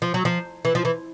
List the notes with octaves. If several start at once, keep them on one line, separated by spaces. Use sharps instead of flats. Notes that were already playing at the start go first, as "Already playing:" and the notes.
F3
F#3
F3
E3
F3
E3